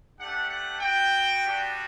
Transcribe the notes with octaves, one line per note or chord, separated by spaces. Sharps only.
A3 D4 G4 F#5
F#5
B3 F#4 G5
G3 B3 D4 F#4